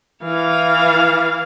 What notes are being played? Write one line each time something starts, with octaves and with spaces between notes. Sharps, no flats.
E3 F5